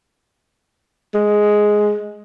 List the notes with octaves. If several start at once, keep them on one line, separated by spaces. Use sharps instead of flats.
G#3